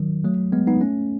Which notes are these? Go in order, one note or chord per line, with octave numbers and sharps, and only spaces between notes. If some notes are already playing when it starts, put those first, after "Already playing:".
Already playing: D#3 F#3
F#3 A3
G#3 B3
B3 D#4
A3 C#4